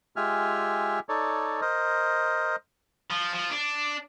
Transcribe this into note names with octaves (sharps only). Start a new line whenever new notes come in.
G#3 F4 G4 E5 G#5 F6
D#4 A4 C#5 D5
A#4 C5 D#5
F3
F3
D4